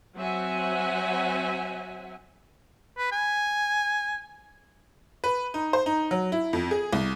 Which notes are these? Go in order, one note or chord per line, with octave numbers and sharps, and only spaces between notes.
F#3 C4 E5 F#5 G#5
B4
G#5
B4
D#4
C5
D#4
F#3
E4
F2
G#4
C2